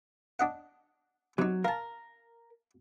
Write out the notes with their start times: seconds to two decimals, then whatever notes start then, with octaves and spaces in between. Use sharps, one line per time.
0.39 D4 D#5 F#5
1.38 C3 F#3 D#4
1.65 A#4 F5 A5